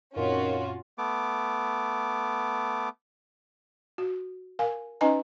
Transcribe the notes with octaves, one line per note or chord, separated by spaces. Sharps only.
F#2 A#2 D#3 C4 C#4 F4 F#4
A3 B3 D6
F#4
A#4 F5 G#5
C#4 D#4 B4 D#5 G#5 A#5